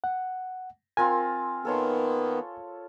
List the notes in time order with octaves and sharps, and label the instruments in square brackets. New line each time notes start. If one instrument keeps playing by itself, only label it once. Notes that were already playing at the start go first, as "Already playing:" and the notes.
[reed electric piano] F#5
[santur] C4 F4 A#4 [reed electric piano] G#5
[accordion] D#3 A#3 B3 [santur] A4 C#5 C6